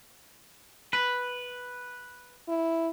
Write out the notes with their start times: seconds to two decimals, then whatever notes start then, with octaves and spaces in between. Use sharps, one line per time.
0.93 B4
2.48 E4